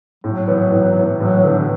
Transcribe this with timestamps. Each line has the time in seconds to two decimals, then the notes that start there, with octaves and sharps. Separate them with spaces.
0.24 A2 F#3
0.48 E3 B3
0.72 A2
0.96 E3 B3
1.20 A2 F#3
1.45 D3 E3 B3